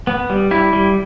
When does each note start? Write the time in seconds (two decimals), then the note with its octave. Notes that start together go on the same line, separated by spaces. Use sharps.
0.07 B3
0.30 G3
0.51 G3 E4
0.73 G3